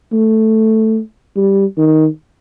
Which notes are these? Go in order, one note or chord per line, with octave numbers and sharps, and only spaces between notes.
A3
G3
D#3